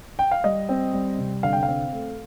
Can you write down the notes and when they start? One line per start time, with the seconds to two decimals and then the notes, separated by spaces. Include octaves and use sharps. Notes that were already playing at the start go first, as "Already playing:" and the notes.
0.19 G5
0.31 F5
0.44 G3 D#5
0.69 C4
0.93 G3
1.18 C3
1.43 D3 F5
1.53 G5
1.63 F5
1.68 C4
1.92 A3